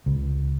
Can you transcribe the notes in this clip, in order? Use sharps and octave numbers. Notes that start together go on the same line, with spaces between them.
C#2